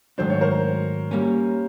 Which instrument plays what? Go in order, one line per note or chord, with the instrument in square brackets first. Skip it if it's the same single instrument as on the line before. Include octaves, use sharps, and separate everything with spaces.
[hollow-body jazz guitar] G#2 D#3 F#3 A3 D4 [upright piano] C5
[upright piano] C#5
A#4 C5
[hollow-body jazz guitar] G3 A#3 C#4